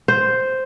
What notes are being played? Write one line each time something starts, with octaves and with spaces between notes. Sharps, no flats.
C5